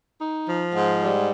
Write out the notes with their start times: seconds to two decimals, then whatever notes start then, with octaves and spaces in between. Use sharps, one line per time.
0.20 D#4
0.47 F3
0.73 G#2
1.01 G3